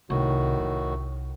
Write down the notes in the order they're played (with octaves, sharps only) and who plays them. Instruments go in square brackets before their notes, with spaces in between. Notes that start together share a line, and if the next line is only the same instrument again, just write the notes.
[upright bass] C2 [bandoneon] A2 D#3 F#4
[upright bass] C2